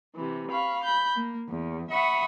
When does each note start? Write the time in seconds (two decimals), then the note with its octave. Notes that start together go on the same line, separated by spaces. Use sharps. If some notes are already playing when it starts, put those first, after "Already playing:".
0.15 C3 E3
0.50 F5 B5 C#6
0.84 B5 G6
1.16 A#3
1.49 E2
1.91 E5 F#5 B5 C#6 D#6